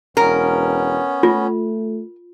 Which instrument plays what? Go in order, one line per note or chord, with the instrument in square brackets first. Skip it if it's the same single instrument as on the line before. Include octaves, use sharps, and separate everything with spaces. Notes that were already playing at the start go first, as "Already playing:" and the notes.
[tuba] E1 [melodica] B3 C#4 [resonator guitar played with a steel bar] A#4
[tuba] A3 [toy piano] F4